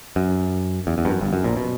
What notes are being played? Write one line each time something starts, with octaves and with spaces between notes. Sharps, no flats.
F#2
E2
E2
G2
F#2
G1 G2
F#2
A#1 A#2
B2